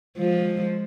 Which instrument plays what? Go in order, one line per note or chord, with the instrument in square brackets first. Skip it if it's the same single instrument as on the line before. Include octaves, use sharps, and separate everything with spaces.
[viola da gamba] F3 G#3